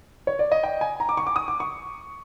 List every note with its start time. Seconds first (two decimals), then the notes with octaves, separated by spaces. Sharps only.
0.27 C#5
0.39 D5
0.52 D#5
0.64 G5
0.81 G#5
1.00 A#5
1.09 D6
1.17 C#6
1.27 D6
1.36 D#6
1.48 D6
1.60 C#6